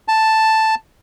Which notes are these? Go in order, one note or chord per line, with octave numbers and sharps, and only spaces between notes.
A5